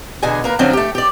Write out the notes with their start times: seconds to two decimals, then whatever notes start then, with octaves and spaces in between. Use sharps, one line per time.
0.23 E2 B2 D3 G#4 G#5
0.44 A#3 A#4 B4
0.59 D3 F3 F#3 C4 C#4
0.73 A3 G4
0.95 G4 D5